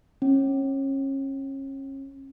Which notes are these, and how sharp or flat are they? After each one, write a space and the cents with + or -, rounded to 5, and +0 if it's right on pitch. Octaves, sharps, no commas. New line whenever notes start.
C#4 -30